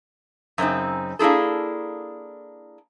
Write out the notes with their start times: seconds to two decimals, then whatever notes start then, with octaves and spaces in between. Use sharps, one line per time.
0.58 F#2 C#3 C4 D#4
1.19 A#3 D4 E4 G#4 A4